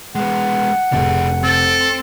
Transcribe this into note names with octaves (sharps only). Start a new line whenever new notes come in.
G#3 B3 F#5
F1 D4 G#4
C4 A4